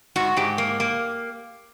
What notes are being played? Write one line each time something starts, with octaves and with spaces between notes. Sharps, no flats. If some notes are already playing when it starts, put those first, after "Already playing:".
G#2 F#4
G#2 G4
A#3
A#3